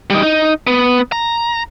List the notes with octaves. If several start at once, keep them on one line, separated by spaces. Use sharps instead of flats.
G3 D#4
D#4
B3
A#5